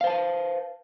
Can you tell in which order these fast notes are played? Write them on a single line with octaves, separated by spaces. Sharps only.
F5 C5 A5 B4